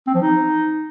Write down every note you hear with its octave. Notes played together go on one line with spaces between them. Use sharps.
C4
F3
D#4